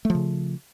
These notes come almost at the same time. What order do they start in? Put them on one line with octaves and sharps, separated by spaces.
A3 F3 C#3